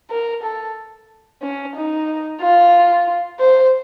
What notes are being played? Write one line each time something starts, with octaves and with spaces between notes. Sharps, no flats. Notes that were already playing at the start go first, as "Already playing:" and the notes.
A#4
A4
C#4
D#4
F4
C5